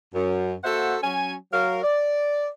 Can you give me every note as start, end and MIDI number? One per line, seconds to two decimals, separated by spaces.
0.14 0.53 42
0.64 0.96 58
0.64 0.96 66
0.64 0.96 69
0.64 0.96 72
0.64 0.96 76
0.64 0.96 78
1.02 1.34 54
1.02 1.34 61
1.02 1.34 80
1.52 1.79 54
1.52 1.79 70
1.52 1.79 77
1.83 2.47 74